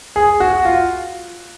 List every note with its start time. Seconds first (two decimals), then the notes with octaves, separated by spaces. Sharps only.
0.16 G#4
0.40 F#4
0.65 F4